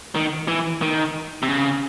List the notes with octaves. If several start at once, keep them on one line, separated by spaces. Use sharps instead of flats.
D#3
E3
D#3
C3
C#3